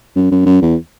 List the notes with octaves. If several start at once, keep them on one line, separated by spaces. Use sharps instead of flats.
F#2
F#2
F#2
E2